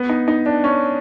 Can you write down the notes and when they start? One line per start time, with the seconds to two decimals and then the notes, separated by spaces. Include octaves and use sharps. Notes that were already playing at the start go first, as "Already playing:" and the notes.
Already playing: B3
0.09 D#4
0.28 D#4
0.46 D4
0.64 C#4